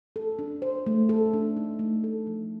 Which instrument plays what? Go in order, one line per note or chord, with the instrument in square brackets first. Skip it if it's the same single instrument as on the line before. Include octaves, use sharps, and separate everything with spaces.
[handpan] A4
D4
C5
A3
A4
D4
D#4
A3
A4
F3